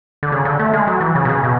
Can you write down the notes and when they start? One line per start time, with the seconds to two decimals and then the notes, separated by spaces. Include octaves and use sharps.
0.23 D3
0.32 C#3
0.45 D3
0.59 A3
0.73 G#3
0.87 F#3
1.01 E3
1.15 C#3
1.25 B2
1.29 C#3
1.44 B2